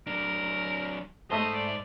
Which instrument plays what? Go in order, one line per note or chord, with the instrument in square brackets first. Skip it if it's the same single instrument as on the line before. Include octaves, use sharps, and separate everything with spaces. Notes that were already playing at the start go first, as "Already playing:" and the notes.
[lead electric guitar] F#3 D4 [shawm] A#4
[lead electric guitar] G#2 C5 [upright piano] A3 A5 G7 [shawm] D#5
[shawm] D5